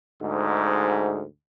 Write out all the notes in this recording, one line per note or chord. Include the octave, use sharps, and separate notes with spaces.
D2 G#2